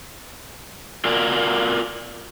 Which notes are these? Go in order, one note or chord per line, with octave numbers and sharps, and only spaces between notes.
F4 F#4 A#4 D5